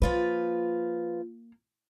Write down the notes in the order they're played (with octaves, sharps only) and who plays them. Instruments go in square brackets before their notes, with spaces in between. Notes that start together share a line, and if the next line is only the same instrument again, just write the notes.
[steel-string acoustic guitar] F3 F4 B4 [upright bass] A#3